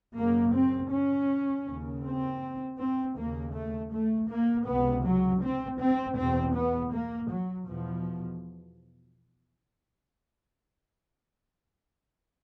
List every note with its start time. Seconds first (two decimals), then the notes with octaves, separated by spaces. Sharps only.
0.16 F#2 C#3 A#3
0.54 C4
0.91 C#4
1.66 D#2 C#3
2.04 C4
2.79 C4
3.17 D#2 C#3 A#3
3.55 A3
3.92 A3
4.30 A#3
4.67 C#2 C3 B3
5.05 F#3
5.43 C4
5.80 C4
6.18 E2 B2 C4
6.56 B3
6.93 A#3
7.31 F#3
7.68 E2 B2 F3